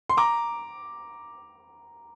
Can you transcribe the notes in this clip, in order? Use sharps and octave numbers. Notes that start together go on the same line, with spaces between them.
C6
A#5 D6